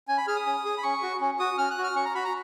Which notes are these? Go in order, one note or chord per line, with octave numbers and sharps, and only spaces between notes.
C#4 G#5
B5
G#4 F6
D#6
C#4
G#4
B5
C#4 C#6
F#4
C#4
F#4 D#6
C#4 F6
F#6
F#4
F6
C#4 C#6
A#5
F#4 B5
A#5